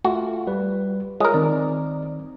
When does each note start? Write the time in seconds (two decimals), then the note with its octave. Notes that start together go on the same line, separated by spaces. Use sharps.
0.05 A3 F4 F#4
0.47 G3 B4
1.20 G#3 F4 A#4 C#5 D#6
1.34 D#3 C4 D#4 D5